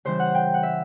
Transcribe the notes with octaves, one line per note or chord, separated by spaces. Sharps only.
C#3 E3 G3 C5
F#5
G5
F#5
E5